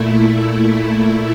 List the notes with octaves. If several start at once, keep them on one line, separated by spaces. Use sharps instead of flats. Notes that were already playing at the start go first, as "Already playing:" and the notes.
Already playing: A#2 A3 E4